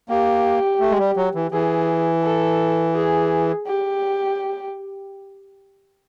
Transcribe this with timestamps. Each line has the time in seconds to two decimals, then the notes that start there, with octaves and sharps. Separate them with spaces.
0.09 A#3 G4
0.80 A3
0.91 G#3
0.99 G3
1.17 F#3
1.35 E3
1.52 E3 G#4
2.23 A4
2.95 G#4
3.67 G4